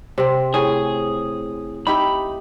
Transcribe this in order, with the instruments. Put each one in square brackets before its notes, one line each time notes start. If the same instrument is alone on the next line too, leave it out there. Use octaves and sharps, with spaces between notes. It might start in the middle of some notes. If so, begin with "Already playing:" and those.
[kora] C3 C4
[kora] A2 [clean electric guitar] G#4
[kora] D#4 G4 E5 [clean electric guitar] B5